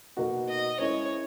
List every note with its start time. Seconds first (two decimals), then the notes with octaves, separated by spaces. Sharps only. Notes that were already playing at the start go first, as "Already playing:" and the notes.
0.17 B2 A#3 D#4 F#4
0.48 D#5
0.79 G#3 C#4 E4 A#4 C#5 D#5